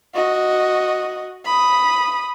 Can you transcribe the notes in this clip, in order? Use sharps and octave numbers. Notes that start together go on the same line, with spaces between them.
F#4 D#5
B5 D#6